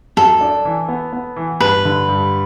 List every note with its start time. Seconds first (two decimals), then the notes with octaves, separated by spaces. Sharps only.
0.17 F#2 A4
0.41 D4
0.65 E3
0.88 B3
1.13 B3
1.36 E3
1.60 G2 B4
1.85 D3
2.09 G2